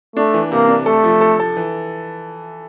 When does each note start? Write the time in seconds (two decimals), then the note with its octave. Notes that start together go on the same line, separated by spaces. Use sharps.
0.16 A3 D4
0.34 E3
0.51 C3 A#3
0.69 D4
0.86 A3 A4
1.04 F3
1.21 A4
1.40 A4
1.57 E3